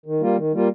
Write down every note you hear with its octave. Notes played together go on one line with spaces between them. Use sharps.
D#3
G3 A#3 F4
D#3
G3 A#3 F4